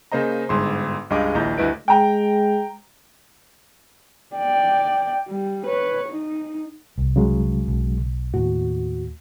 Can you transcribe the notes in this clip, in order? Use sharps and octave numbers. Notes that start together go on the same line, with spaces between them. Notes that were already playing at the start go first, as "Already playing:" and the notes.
C#3 A#3 C5 D#5 A#5
G1 G#2 C6
C#2 G2 G#3 D#5 F5 D6
A#1 D#2 E4 D#5 A#5 G6
D2 G2 E4 B4 D#5 D7
G#3 G5 A#5
D5 G5
G3
B4 C#5
D#4
C2
C#3 F#3 G#3
B1
D#2 A2 F#4